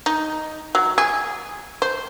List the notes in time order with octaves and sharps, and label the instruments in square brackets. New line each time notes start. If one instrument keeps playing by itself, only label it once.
[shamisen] D#4
F#3
G#4
C5